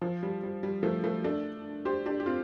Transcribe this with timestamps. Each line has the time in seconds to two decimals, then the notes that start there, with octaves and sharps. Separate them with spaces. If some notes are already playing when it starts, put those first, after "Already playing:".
0.02 F3
0.23 G3
0.43 G3
0.63 G3
0.83 F3 A3
1.04 F3 A3
1.24 A3 D4
1.85 G4 C5
2.06 D4 G4
2.20 G4
2.26 C4 F4